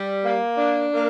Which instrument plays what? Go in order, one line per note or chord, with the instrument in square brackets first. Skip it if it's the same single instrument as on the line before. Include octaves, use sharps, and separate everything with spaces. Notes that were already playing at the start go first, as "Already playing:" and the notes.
Already playing: [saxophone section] G3
A#3
D4
A#3